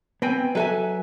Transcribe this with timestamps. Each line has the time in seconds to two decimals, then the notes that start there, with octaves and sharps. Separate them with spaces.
0.22 B3 C4 G5 G#5
0.55 F#3 A4 B4 E5 G#5